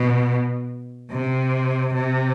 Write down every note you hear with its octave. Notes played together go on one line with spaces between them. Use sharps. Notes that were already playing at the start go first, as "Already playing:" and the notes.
Already playing: B2
C3
C3